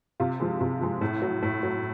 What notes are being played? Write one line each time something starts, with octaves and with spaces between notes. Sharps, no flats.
C3 F4
F3 G#3
C3
F3 G#3
A2
F#3
A2
F#3